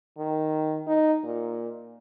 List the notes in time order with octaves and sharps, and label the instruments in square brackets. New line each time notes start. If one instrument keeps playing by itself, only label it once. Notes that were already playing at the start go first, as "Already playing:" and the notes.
[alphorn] D#3
D#4
A#2